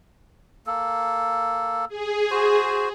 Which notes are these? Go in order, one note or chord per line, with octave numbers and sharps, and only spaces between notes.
A#3 A4
G#4
F#4 C5